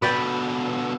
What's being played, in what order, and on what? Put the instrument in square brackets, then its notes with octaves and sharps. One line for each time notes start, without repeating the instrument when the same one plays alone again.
[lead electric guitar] B2 D3 [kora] B4 D5 G5